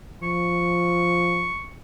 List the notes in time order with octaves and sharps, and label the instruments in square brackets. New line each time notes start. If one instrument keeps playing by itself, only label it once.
[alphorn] F3 [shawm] C#6